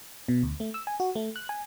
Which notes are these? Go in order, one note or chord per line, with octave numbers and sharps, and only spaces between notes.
B2
D2
A3
E6
G#5
F#4
A3
F#6
G#5